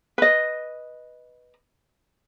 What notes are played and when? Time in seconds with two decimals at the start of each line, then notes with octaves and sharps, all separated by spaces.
0.18 B4 D#5